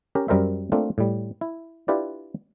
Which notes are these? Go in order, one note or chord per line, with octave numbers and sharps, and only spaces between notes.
C#4 G4 A#4
F#2 G3 A#4 C5 E5
A3 A#3 C4 D4 F4
A2 G3
E4
D4 E4 F4 G4 B4 D5